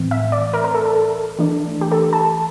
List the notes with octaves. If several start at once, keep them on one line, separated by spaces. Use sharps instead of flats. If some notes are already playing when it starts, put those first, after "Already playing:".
Already playing: A2 E3 A3 C4
E5
D5
A#4
A#4
A4
A4
E3 A3 D4
G4
A4
A5